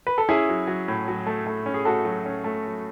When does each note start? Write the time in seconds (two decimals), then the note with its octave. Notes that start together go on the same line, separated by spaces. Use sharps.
0.07 B4
0.18 A4
0.29 C#4 E4 G#4
0.49 F#3
0.67 F#3
0.88 A2
1.08 F#3
1.27 A3
1.47 A3
1.66 C#4
1.74 G#4
1.85 A3 F#4 A4
2.05 F#3
2.26 C#4
2.44 A3
2.65 F#3